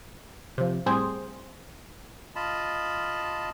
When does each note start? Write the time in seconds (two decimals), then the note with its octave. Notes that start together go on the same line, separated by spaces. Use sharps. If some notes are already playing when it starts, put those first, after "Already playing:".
0.58 C3 F3
0.86 A2 G3 C4 G#4 C5
2.36 F4 D#5 A5 B5